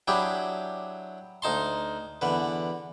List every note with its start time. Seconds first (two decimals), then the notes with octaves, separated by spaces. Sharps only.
0.08 F#3 D4 E4 G4 G#4
1.42 D2 D#4 A5 C6
2.21 E2 D3 B4